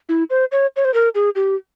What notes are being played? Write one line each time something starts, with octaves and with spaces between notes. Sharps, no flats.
E4
C5
C#5
C#5
C5
A#4
G#4
G4